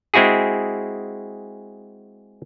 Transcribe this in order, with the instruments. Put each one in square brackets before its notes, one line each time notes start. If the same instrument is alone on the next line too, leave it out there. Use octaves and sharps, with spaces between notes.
[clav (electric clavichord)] G#3 C4 E4 F#4 G#4